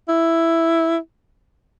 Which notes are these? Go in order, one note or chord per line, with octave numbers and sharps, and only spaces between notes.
E4